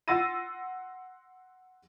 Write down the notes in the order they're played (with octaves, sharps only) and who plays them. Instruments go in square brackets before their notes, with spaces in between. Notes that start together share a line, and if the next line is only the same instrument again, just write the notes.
[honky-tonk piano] F#5 C6 E6 A6 A#6 D#7